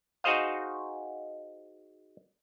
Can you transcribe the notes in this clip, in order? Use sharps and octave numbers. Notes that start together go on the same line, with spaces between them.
D#4 F#4 G#4 C5 D#5 F5